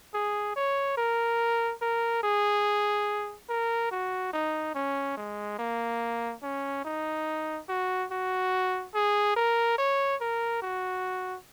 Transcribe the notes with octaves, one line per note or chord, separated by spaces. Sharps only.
G#4
C#5
A#4
A#4
G#4
A#4
F#4
D#4
C#4
G#3
A#3
C#4
D#4
F#4
F#4
G#4
A#4
C#5
A#4
F#4